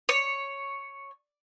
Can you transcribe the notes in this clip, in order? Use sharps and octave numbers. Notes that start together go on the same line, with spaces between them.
C#5